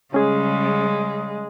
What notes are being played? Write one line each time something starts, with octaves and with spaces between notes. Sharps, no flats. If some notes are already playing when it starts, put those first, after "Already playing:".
C#3 G3 G#3 C#4 G#4